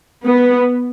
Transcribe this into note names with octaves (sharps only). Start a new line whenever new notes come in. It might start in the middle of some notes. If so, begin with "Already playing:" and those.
B3